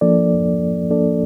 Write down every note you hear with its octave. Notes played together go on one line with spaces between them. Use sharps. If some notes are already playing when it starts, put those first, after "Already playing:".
F3 A#3 D4 A4 D5
F3 A#3 D4 A4 D5